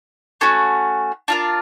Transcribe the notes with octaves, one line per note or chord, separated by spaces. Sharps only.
A3 C#4 F#4
D4 F4 A#4